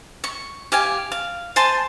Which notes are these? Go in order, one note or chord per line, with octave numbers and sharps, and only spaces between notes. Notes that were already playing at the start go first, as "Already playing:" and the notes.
C#6
G4 F5 G#5
F5
C5 G#5 A5 C6